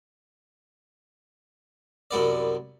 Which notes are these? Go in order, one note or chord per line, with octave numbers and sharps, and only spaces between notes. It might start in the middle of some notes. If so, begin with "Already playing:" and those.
C2 F#2 B3 D5